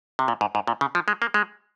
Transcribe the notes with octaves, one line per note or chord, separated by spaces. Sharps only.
C3
A#2
G#2
G#2
A#2
C#3
F3
G#3
A#3
G#3